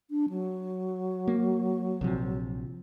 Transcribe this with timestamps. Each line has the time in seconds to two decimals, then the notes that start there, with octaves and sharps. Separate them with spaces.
0.10 D4
0.29 F#3
1.28 A#3
2.01 A#1 C3 F3